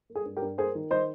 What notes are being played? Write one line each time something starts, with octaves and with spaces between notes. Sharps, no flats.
A#3
G#4
G2
G4 A#4
G2
A#3 G#4 C5
D#3
D#3 C5 D#5